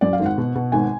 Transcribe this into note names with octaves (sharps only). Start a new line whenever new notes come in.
F#2 D5
F5
G#1
F#5
B2
B2
G#1 G#5